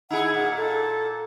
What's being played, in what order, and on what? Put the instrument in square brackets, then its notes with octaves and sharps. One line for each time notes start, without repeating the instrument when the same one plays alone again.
[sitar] D#4 E4 G#4 [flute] F#5
[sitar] A#2 [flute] F#5
[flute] A4